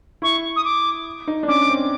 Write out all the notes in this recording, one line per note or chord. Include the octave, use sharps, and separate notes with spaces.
E4 C#6
D#6
D6
D#4
D4
C#4 D6
C4